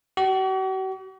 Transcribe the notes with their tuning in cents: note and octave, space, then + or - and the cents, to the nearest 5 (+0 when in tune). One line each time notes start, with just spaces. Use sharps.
F#4 +45